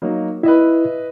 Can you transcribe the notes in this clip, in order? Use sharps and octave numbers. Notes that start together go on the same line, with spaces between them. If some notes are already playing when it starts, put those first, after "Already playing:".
F#3 A#3 D#4
E4 B4 D#5 E5